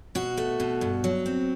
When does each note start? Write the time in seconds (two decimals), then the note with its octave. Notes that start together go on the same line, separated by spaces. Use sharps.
0.15 B2 F#4
0.37 A3
0.60 B2
0.81 G2
1.04 F#3
1.26 C4